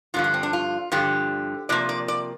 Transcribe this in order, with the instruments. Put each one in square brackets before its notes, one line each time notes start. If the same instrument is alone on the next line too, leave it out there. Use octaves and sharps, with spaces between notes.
[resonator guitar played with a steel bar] G2 D3 F3 F4
D4
C4
D4
F4
G2 D3 F3 G4
C3 F3 A#3 D5
D5
D5